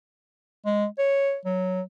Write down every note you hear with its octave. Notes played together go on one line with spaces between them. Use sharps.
G#3
C#5
F#3